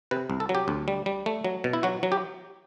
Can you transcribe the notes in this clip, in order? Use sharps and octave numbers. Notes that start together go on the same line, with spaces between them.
C3 B4
C2
A4
F#3
G4
D2
G3
G3
A3
F#3
B2
E4
F#3 F#4
F#3
G4